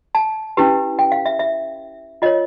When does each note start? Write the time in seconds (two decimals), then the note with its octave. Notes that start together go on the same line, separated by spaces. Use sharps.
0.15 A5
0.57 C#4 E4 G4 B4
0.99 G5
1.12 F5
1.26 E5
1.39 E5
2.22 F4 A#4 C#5 D#5